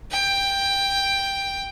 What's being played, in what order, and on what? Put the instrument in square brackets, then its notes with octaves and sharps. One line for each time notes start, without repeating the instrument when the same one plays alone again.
[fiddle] G5